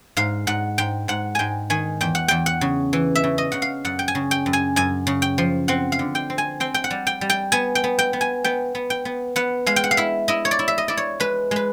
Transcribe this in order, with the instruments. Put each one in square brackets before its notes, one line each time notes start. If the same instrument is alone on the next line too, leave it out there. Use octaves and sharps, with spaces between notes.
[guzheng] G#2 F5
G#2 F#5
G#2 G5
G#2 F#5
G#2 G5 G#5
D#3 G#5
E2 G5
F#5
E2 G5
F#5
C#3
E3
E5
C#3
D#5
C#3 F#5
F5
F#2 F#5
G5
G#5
C#3
G5
F#2
G#5
F#2 G#5
C#3
G5
F3
C4 F#5
F5
D3
G5
C4
G#5
C4 G5
G5
F#5
G3
G5
G3
G5
B3 G#5
G5
B3
G5
B3
G#5
B3 G5
B3
G5
B3
B3 F#5
G#3 F5
G5
F#5
F5
E4 E5
E4 D#5
C#5
D5
E4
E5
D#5
E4 D5
C#5
G#3 B4
G#3 B4